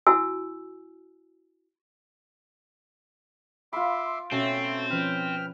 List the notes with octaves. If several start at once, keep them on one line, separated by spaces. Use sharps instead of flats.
E4 F#4 G#5 E6
F4 E5 B5 C6 D6
B2 A3 C4 C#4 E5 A5
F3 C#4 B4 G5 F6